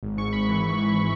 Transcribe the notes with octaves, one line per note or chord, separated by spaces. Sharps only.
G#1
G#2 C#6
G#1 B5
E3
G#1
E3